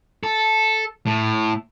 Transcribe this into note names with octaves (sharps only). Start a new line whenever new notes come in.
A4
A2